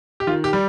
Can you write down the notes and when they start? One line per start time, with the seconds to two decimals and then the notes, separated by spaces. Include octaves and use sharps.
0.20 G4
0.27 D#3 F4
0.44 G4
0.53 G3